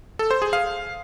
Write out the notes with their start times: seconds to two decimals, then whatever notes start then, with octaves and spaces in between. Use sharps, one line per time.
0.19 A4
0.31 C5
0.42 G#4
0.53 F5